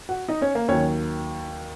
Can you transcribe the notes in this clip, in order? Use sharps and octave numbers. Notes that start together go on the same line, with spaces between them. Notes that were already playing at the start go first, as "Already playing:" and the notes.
F#4 F#5
D#4 D#5
C#4 C#5
A#3 A#4
D#2 D#3 F#3 C#4 C#5